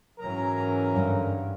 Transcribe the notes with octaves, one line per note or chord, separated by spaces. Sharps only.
G#2 E3 F#3 C#4 A#4 A#5
G2 D3